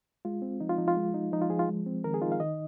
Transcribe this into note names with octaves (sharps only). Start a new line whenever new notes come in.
G#3 F4
C4
F3 D#4
F4
F3 D#4
F4
G#3
D#4
F3 D#4
F4
F3 G#4
F4
G#3
C4
D#3 A#4
G#4
D#4 F4
F5
D#3 D#5